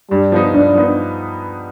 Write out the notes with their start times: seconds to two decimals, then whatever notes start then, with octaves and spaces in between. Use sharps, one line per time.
0.10 G2 G3
0.32 F3 B3 D#4
0.54 G2 D4
0.75 F3 B3 D#4